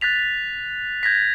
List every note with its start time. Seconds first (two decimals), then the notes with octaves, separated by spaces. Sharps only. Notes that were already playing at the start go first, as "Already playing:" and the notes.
0.01 F#6 A6 B6 F7
1.03 G6 G#6 A#6 B6